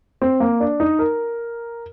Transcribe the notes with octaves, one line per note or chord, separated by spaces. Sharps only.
C4
A#3
D4
D#4
A#4